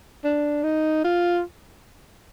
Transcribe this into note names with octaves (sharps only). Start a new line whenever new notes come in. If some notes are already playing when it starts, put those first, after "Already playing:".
D4
D#4
F4